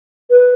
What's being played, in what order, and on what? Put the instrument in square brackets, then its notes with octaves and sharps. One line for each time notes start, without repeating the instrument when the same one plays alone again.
[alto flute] B4